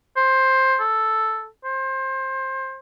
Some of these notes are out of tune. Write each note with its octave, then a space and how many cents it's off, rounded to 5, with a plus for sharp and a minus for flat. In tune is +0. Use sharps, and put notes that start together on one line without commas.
C5 +15
A4 +0
C5 +25